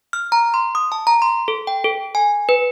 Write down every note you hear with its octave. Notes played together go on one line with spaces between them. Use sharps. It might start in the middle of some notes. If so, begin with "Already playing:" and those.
F6
A#5
C6
D#6
A5
A#5
C6
A4
G5
A4
G#5
B4